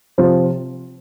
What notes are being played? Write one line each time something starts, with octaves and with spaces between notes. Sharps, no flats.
C3 F3 C4 F4